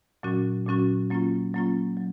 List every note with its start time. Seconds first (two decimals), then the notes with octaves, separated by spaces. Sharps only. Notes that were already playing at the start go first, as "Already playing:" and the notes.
0.23 A#2 F#3 C#4 F#4
0.67 A#2 F#3 C#4 F#4
1.10 F#3 A#3 C#4 F4
1.54 F#3 A#3 C#4 F4
1.97 F#3